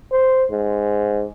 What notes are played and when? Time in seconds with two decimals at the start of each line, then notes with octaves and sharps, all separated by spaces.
0.11 C5
0.51 G#2